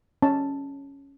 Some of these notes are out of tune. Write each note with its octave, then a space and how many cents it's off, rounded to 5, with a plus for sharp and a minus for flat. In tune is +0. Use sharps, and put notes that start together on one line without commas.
C#4 +0 A5 +0